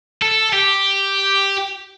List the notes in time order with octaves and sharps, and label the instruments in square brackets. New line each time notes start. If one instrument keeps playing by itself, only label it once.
[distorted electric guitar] A4
G4